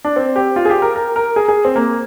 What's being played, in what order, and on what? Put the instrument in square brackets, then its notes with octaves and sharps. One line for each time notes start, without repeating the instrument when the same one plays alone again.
[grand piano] D4
C4
G4
F4
G#4
G4
A#4
A#4
A#4
G#4
G#4
C4
A#3